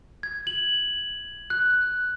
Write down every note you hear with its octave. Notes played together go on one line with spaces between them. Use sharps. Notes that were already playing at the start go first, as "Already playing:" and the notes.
G#6
F#7
F#6